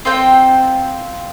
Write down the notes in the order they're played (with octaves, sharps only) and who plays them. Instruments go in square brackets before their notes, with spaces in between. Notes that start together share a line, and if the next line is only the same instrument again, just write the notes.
[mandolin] C4 F4 C5 G5